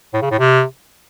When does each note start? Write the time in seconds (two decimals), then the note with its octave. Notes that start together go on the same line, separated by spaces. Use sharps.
0.13 A2
0.22 C#3
0.30 A2
0.39 C3